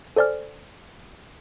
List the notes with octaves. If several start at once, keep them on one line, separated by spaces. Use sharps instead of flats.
A4 C5 D5 G#5 F6